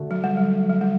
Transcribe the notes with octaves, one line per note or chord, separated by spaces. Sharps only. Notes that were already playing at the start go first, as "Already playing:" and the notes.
Already playing: D3 A3 F#4
F#3
G3
F#3
F#3
G3